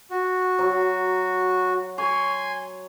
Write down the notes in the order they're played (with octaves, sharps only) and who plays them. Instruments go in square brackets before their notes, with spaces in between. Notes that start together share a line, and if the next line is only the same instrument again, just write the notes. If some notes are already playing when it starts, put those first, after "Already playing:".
[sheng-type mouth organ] F#4
[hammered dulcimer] F#3
[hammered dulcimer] C#5 [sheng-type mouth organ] G#5 C6